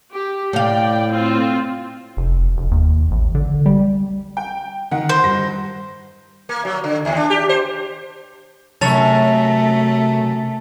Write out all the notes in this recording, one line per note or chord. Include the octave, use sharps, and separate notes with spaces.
G4
A2 D5 F5 G5
C4 F4
F1
F1
D#2
A1
D3
G3
G5
D#3 F#5
C5
G2 A#6
A#3
F#3
D3
D#2
D4
G4
C5
F#2 C3 A3 C#5 A5 A6 F7